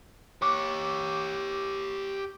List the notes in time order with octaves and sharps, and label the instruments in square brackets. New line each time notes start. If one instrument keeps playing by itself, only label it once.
[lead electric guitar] G4 C#5 [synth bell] C#6 D6